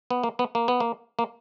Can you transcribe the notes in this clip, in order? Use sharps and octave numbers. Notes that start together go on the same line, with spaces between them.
B3
A#3
B3
A#3
B3
A#3
A#3